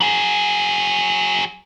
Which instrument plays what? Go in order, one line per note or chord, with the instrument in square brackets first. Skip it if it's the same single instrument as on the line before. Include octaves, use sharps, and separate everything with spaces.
[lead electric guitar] F#3 G#4